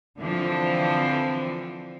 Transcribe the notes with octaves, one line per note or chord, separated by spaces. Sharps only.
D3 E3 F3 C4